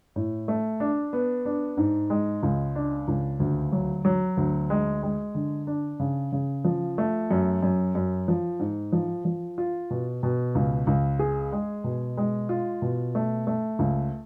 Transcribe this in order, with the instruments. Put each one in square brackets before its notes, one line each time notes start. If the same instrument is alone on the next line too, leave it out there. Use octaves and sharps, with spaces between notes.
[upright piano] A2
A3
D4
B3
D4
G#2
G#3
C#2
D4
C#2
D2
F#3
F#3
D2
G#3
G#3
D3
D4
C#3
C#3
F3
A3
F#2
F#2
F#2
F3
G#2
F3
F3
F4
B2
B2
C#2
C#2
G#4
G#3
B2
G#3
F4
B2
A3
A3
C#2